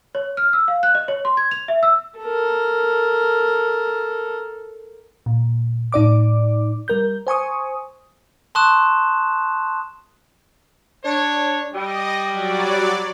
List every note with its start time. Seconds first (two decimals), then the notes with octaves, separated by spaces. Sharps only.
0.15 C#5
0.37 F6
0.53 E6
0.68 F5
0.83 F#6
0.95 D#5
1.08 C#5
1.25 C6
1.37 G#6
1.51 F7
1.68 E5
1.83 E6
2.19 A4 A#4
5.26 A#2
5.92 A2 D#4 D5 D6
6.88 G3 A#4 G6
7.27 C5 G#5 C#6 D#6
8.55 A5 C6 C#6 D#6 F#6 E7
11.04 D4 C#5
11.74 G3 D#5
12.30 F#3 D5